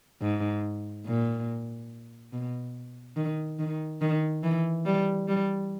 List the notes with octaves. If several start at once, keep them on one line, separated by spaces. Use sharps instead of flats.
G#2
A#2
B2
D#3
D#3
D#3
E3
G3
G3